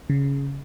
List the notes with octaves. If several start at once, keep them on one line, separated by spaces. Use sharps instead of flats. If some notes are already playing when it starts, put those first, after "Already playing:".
C#3